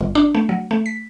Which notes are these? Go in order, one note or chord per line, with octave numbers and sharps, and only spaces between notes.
G1
D4
A3
F#3
A3
B6